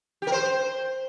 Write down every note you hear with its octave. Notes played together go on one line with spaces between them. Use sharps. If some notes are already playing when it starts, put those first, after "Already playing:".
G4
A#4
C5